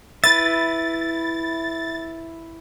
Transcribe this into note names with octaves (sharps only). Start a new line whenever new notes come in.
E4 B4 E5 A6